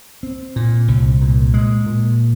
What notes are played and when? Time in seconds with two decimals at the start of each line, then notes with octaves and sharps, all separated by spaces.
0.23 C4
0.56 A#2
0.88 C2
1.21 A#2
1.54 G#3
1.86 A#2